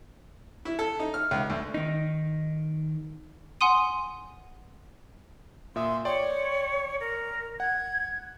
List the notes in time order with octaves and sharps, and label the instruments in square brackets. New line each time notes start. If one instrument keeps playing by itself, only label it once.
[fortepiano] E4
A4
D#4
F6
C#2
D2
[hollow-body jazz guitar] D#3 D#4
[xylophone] F#5 G#5 C6 D#6 D#7
[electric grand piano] A#2 E5 D#6 [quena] C6
[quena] C#5 [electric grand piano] D5 G5 C6
[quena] A#4
[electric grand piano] F#5 [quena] G#6